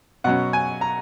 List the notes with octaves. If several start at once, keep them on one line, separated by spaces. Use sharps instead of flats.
B2 F#3 C#4 F#5
G#5
A#5